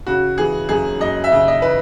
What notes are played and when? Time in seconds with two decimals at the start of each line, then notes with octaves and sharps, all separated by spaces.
0.07 C#3 F#4
0.38 E3 G#4
0.69 F#2 G#4
1.00 F#2 D#5
1.24 E5
1.32 C#3
1.48 D#5
1.62 E3 B4